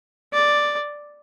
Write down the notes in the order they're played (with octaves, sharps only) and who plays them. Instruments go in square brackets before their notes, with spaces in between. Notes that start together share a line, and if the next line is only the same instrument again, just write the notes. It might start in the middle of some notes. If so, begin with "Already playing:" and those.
[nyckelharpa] D5